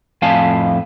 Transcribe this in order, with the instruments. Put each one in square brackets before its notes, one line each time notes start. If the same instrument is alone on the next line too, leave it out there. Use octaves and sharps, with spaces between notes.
[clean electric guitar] F2 A2 F5 G#5 A5